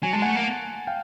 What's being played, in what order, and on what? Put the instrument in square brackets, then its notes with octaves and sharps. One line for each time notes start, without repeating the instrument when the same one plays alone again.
[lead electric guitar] F#3 [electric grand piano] G#5
[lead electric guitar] G#3 [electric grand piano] A5
[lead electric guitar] A3 [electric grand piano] F#5 G#5
[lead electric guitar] A#3
[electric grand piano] F5 G5